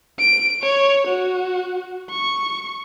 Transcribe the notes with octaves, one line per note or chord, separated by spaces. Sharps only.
D7
C#5
F#4
C#6